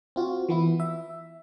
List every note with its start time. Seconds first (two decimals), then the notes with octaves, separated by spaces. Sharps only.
0.16 C4 F4 F#4
0.49 E3 B3 E4
0.80 E5